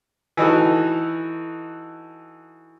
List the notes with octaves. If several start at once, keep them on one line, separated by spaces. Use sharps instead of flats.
E3 D#4 F#4 A4